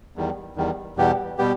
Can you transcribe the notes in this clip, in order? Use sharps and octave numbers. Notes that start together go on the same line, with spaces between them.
E2 D#3 G3
E2 D#3 G3
E2 B2 G3 B3 G4
B2 G3 B3 G4